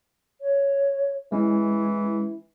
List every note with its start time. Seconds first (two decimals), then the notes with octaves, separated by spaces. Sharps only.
0.41 C#5
1.32 E3 G#3 C#4 E4